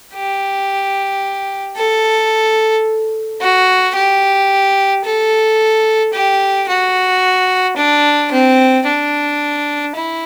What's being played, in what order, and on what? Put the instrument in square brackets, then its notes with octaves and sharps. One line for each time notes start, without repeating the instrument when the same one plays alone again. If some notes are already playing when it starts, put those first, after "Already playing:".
[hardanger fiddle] G4
A4
F#4
G4
A4
G4
F#4
D4
C4
D4
E4